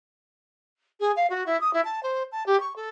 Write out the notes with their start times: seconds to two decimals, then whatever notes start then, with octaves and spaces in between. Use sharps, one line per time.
1.00 G#4
1.16 F5
1.30 F#4
1.46 E4
1.60 D#6
1.73 E4
1.85 A5
2.03 C5
2.32 A5
2.46 G4
2.60 C#6
2.76 A4